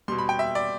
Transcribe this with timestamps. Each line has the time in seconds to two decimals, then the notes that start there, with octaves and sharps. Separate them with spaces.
0.08 B2 G3 C6
0.19 B5
0.29 G5
0.39 E5
0.55 D5